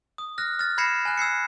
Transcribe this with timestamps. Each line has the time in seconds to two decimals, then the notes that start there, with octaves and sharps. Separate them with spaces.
0.18 D#6
0.38 F6 F#6 A#6
0.59 F6 A6
0.78 B5 G#6 A#6 C7 C#7 E7
1.05 G#5 F#6
1.18 E6 G#6 C7 C#7